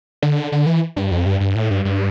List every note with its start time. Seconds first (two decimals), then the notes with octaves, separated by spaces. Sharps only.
0.22 D3
0.52 D3
0.66 E3
0.96 G2
1.11 F2
1.26 G2
1.40 G2
1.55 A2
1.71 G2
1.85 G2